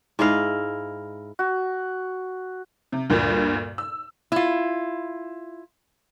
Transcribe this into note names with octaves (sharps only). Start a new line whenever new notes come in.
G#2 E4 D#5 F5
F#4
C3
D2 G2 A#2 A#3
E6
E4 F4